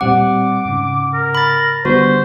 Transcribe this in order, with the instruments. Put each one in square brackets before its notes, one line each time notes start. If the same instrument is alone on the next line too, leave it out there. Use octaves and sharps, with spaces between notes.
[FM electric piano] A#2 G3 C4 [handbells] F#5 [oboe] D6
[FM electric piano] G#2 C#3
[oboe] A#4
[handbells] B5 A6
[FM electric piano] D3 G3 B3 [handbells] F#4 [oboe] C5